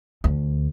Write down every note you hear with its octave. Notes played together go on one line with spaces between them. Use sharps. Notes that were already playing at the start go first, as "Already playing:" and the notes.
D2